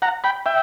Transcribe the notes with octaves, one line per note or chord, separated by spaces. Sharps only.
F#5 A#5
G5 B5
E5 G5